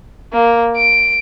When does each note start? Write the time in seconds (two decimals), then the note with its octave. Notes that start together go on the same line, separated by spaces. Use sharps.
0.33 A#3
0.77 D7